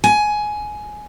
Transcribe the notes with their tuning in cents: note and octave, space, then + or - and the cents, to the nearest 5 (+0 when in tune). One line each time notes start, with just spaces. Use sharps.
G#5 +15